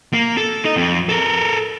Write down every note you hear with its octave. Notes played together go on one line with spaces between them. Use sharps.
A#3
A4
D#4 D#5
F2
A4 A#4